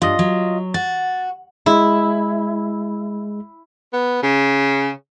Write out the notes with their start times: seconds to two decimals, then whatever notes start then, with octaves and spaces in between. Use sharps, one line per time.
0.02 G2 F4 D#5
0.19 F#3
0.74 F#4 A6
1.66 G#3 E4
3.93 B3
4.23 C#3